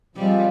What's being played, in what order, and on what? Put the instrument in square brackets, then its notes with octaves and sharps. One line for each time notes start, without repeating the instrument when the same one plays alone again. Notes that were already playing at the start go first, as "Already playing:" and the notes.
[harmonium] F3 G#3 C4 F4 [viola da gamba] G3